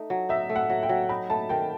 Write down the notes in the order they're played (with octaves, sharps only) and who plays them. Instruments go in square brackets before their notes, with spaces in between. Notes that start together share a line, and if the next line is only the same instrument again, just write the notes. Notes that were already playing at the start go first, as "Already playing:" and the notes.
Already playing: [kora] A3 D#4
F#3
[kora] D#4 [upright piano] E5
[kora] A3
[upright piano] F#5
[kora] F#3
[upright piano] G5
[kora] F#3
[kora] D#4 [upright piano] B5
[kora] A3 [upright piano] A5
[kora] D#3 [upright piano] G5